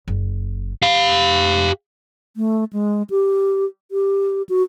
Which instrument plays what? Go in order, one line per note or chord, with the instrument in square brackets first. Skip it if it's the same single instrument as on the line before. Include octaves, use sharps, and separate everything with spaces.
[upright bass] F#1
[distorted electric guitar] G4 F5
[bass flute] A3
G#3
G4
G4
F#4